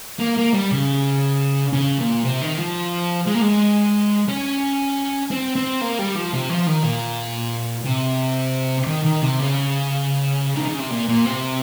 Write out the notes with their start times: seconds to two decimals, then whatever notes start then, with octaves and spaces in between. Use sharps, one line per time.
0.20 A#3
0.37 A#3
0.54 G3
0.72 C#3
1.73 C#3
1.99 A#2
2.24 C3
2.41 D#3
2.59 F3
3.27 G#3
3.35 A#3
3.42 G#3
4.29 C#4
5.31 C4
5.56 C4
5.81 A#3
5.99 G3
6.16 F3
6.32 C3
6.50 F3
6.67 D#3
6.83 A#2
7.85 C3
8.87 D#3
9.04 D#3
9.22 C3
9.39 C#3
10.55 D#3
10.68 C#3
10.80 C3
10.91 A#2
11.08 A#2
11.26 C3